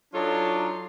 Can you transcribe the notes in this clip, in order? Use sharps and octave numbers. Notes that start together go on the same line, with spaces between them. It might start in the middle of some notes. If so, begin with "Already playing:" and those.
F#3 D4 D#4 F4 A4 C#5